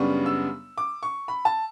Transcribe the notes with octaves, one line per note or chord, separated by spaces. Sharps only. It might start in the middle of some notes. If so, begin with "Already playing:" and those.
Already playing: F#2 C#3 G3 B3 D4 C#6
E6
D6
C#6
B5
A5